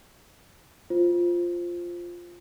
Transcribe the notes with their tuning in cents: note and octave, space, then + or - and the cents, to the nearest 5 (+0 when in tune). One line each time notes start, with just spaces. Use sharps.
F4 +0 C5 +0